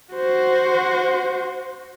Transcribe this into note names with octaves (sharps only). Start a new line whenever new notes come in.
F#4 C5